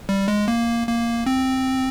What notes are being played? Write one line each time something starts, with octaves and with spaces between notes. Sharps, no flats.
G3
G#3
A#3
A#3
C4